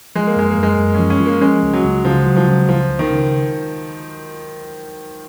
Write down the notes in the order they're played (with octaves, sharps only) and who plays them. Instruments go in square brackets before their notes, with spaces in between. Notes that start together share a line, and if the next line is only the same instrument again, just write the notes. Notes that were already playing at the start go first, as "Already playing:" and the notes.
[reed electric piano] F3 [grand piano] G#3
[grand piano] A#3
[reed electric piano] F#2 [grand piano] G#3
[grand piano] A#3
[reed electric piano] F#2
[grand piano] G#3
[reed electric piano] F#2
[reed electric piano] F3 [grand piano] C#4
[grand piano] C#4
[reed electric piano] F3
[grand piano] A#3
[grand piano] G#3 [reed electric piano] C#4
[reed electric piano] C#2
[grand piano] F#3
[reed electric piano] C#2
[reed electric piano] C#3 [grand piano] F3
[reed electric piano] F#3
[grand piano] F3
[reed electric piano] C#3
[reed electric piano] C#2 [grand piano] F3
[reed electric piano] C#2
[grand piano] D#3
[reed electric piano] C#3